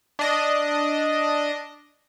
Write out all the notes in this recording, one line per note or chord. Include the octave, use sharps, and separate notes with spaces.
D4 D#5